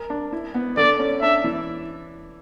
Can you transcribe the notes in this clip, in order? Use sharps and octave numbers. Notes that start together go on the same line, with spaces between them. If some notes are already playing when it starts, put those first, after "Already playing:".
Already playing: A#4
D4
E4
B3
D3 D5
C#4
D4 E5
E3